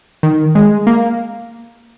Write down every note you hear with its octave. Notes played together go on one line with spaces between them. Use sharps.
D#3
G#3
A#3